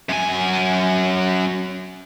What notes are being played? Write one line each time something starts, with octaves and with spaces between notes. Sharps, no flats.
F#2 G#5